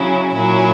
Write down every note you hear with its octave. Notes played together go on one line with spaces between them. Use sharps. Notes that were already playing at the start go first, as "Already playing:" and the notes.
Already playing: C#3 F#3 C#4 E4
A#2 F#3 C#4 E4